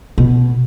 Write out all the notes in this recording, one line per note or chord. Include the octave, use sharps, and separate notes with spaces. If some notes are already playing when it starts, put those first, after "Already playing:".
B2